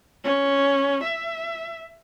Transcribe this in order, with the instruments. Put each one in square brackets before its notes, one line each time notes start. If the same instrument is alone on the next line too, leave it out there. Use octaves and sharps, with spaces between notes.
[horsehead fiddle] C#4
E5